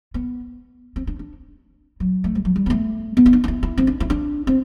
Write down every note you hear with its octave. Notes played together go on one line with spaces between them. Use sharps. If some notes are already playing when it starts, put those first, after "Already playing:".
B3
C4
D4
D4
F#3
A3
G3
F#3
G3
B3
A3
B3
E4
D4
D4
E4
E4
C4
D4
E4
D4
C4